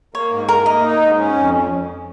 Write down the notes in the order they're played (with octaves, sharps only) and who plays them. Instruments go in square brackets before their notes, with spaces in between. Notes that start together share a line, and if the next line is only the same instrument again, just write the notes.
[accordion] A#3 [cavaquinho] C#5
[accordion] G#2
[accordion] A#3 [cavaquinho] A#4
[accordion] A#3 [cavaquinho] D#5
[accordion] D#4
G#2
C#4
F2